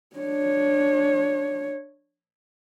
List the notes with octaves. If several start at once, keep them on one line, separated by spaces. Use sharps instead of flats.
D4 C#5